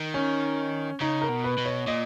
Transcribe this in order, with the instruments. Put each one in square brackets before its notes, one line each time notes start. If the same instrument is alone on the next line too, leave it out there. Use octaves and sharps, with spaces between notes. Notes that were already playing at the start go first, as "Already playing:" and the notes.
Already playing: [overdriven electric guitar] D#3
[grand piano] C#4
[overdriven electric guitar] C#3 [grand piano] D#4
[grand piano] A#4
[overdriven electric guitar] B2
[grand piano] B4
[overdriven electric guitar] B2
[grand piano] C#5
[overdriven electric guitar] A#2 [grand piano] D#5